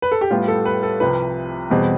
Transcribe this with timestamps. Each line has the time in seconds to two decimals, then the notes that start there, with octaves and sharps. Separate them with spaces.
0.02 B4
0.12 A4
0.21 G4
0.30 A2 G3 B3 F4
0.48 A4
0.66 B4
0.83 A4
1.00 C2 C3 F3 B4
1.70 E2 B2 G3 C4